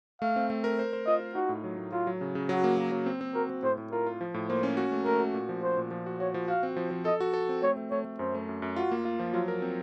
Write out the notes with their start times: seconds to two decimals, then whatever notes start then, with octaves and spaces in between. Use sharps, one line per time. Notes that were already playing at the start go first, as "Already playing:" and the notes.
0.22 A3 F5
0.36 C4
0.50 A3
0.64 A#4
0.79 C5
0.93 C5
1.07 F4 D#5
1.20 F4
1.35 D#4 F#4
1.49 A2
1.64 F#3
1.78 A2
1.92 F#3 F4
2.07 F#3
2.21 C#3
2.35 C#3
2.49 F#3 F#4
2.64 A#3
2.77 A#3
2.92 F#3
3.06 C4
3.21 C4
3.35 F#4 A#4
3.50 C4
3.63 A2 C5
3.78 A2
3.92 F4 A#4
4.06 F4
4.21 F3
4.34 A2
4.49 A#3 C5
4.63 C#4
4.77 F#4
4.92 A3
5.05 A3 A#4
5.20 F#4
5.34 A#2
5.49 F3
5.63 F#4 C5
5.77 A#2
5.91 F3
6.06 F#4
6.20 F#4 C#5
6.34 F3
6.48 F#4 F5
6.63 C4
6.77 F3
6.91 F3
7.05 A4 D#5
7.20 F#4
7.34 A4
7.49 C4
7.63 A3 C#5
7.77 A3
7.91 A3 C#5
8.05 A3
8.19 F#2 C5
8.34 A3
8.49 F#2
8.62 F#2
8.76 F4 F#4
8.92 A#3
9.05 F4
9.19 F3
9.34 F#3 F4
9.48 A#4
9.62 C4